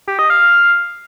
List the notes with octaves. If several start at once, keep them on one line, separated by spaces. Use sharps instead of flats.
G4
D#5
F5